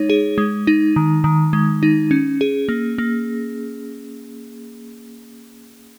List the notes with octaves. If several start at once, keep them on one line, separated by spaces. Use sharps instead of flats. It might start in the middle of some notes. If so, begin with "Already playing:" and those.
Already playing: G#3 D#4 C#5
G#4
G#3
D#4
D#3
D#3
G#3
D#4
C#4
G#4
A#3
A#3